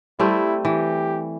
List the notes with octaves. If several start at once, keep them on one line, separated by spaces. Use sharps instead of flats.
G3 A3 C4 E4
E3 G4